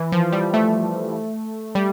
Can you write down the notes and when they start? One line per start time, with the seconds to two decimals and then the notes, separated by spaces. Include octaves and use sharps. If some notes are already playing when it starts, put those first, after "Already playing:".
Already playing: E3
0.12 F3
0.32 G3
0.54 A3
1.75 G3